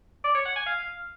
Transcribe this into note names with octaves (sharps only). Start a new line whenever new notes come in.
D5
C#5
F#5
G#5
F5